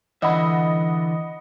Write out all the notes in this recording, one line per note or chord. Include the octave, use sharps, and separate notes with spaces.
D3 E3 D#5 E5 F#5 B5